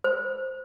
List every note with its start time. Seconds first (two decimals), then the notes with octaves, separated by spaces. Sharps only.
0.04 C5